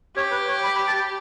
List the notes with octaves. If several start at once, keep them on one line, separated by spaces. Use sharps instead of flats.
G4 C#5
B4
C#5
B5
B5
A5
G5